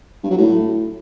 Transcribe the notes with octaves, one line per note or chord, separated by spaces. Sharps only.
G2
F#3
A2